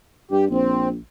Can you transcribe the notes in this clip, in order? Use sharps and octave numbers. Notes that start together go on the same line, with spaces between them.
G2 G4
A#1 C4